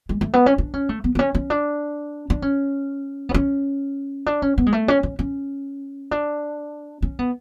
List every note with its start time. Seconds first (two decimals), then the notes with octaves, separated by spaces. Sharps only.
0.09 G#3
0.21 A3
0.34 B3
0.46 C#4
0.58 D4
0.74 C#4
0.89 A3
1.04 B3
1.15 B3
1.19 C#4
1.35 C#4
1.50 D4
2.30 D4
2.42 C#4
3.29 B3
3.34 C#4
4.26 D4
4.42 C#4
4.58 B3
4.66 G#3
4.73 A3
4.88 C#4
5.03 C#4
5.19 C#4
6.11 D4
7.02 C#4
7.19 B3